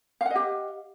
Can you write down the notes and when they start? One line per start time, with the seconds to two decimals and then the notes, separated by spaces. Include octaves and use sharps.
0.21 F5
0.26 F#5
0.31 D#5
0.36 G4